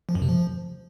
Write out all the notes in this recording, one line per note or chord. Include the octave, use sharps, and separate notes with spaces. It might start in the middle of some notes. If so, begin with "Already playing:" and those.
F3
F#2
C3
F3